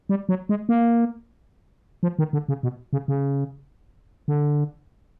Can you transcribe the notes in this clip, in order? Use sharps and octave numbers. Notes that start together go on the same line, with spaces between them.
G3
F#3
G#3
A#3
F3
D#3
D3
C#3
B2
C#3
C#3
D3